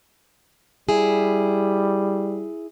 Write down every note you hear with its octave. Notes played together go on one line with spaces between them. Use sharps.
G3 E4 G#4